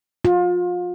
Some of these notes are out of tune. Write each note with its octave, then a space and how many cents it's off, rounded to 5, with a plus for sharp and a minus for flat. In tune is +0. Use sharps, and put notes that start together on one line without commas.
F4 +30